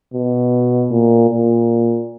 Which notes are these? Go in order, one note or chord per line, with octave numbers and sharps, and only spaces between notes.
B2
A#2
A#2